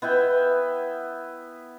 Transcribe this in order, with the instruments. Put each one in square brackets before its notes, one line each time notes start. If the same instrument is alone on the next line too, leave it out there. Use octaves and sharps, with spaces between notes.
[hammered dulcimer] B3 E4 E5 G5